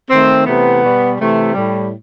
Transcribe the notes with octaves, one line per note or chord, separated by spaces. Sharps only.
D#3 A3 C4
C3 E3 A3 B3
B2 G3
C3 E3 A3
A2 G3